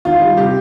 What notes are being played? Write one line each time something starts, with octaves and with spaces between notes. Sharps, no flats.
D#3 F4
G3
C3 G4